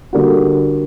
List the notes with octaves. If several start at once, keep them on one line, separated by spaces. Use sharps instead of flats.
D3 G3 A#3 D4 F#4